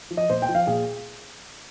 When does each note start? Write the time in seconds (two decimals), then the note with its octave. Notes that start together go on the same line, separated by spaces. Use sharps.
0.11 F3
0.17 D#5
0.29 A#2 C5
0.42 G5
0.49 F3
0.55 F5
0.67 A#2 G#4